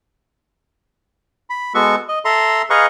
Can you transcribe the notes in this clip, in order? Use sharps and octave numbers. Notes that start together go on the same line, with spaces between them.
B5
G#3 B3 F#4 A4 C#6
D#5
A4 E5 A#5 C6
G#4 B4 D#5 F5 A#5 C#6